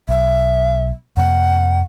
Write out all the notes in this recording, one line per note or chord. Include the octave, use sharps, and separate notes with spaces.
B1 E5
F2 C3 A#3 F#5